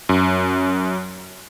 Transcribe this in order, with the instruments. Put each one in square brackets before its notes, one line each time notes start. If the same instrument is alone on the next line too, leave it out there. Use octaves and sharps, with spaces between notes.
[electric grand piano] F#2